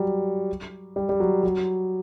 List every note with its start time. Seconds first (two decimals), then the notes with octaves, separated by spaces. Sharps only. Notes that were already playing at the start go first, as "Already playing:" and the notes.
Already playing: F#3 G3
0.96 G3
1.09 G3
1.20 F#3
1.43 F#3